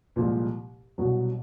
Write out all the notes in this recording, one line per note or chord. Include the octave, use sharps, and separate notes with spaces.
C2 A#2 F3 G#3
C2 B2 F#3